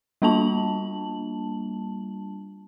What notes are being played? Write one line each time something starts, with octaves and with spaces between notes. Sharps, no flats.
G3 A#3 D4 F4 A5 F#7